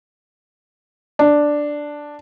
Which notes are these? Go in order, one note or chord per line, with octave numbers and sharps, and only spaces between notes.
D4